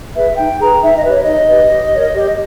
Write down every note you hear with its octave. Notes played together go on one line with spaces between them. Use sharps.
G#4 B4 E5
D#4 G5
G#4 B4 A#5
D#4 E5
D#5
G4 B4 C#5
D#4 D#5
G4 B4
G4
A#4 C#5
G4